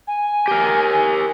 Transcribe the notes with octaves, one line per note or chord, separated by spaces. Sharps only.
G#5
G4 A#4